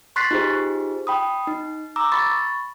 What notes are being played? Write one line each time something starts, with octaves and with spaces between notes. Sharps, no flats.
C6 C#6 F#6 A6 B6 C7
D#4 F4 G4 G#4 C5
G5 B5 D#6
D#4
A#5 D6 E6
B5 C#6 A6